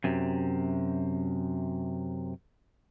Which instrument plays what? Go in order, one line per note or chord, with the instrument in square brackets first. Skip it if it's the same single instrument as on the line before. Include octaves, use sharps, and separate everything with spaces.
[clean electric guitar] F#2 C3